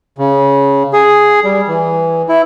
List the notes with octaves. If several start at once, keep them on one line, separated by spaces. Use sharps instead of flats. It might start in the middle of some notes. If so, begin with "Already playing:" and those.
C#3
G#4
G3
E3
E4